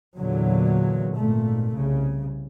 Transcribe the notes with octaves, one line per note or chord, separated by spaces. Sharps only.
E2 A#2 D3 F#3
G#1 A#2 A3
C2 C#3